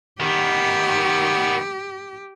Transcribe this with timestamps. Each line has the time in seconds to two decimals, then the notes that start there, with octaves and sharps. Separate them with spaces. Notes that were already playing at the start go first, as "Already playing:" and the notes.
0.20 D#3 B3 G4